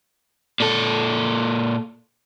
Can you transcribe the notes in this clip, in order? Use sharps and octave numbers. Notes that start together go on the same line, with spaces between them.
A#2 A4